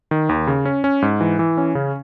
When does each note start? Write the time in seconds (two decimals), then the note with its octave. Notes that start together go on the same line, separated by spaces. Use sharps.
0.11 D#3
0.29 D#2
0.47 C#3
0.65 C#4
0.84 C#4
1.02 G#2
1.21 E3
1.39 E3
1.58 C#4
1.75 C#3